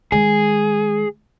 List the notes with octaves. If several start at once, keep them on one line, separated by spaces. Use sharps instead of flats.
D#3 G#3 G#4